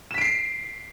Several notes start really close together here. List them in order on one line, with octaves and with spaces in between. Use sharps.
E7 B6 D7 C7